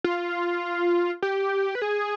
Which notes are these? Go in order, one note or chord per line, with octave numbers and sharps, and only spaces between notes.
F4
G4
B4
G#4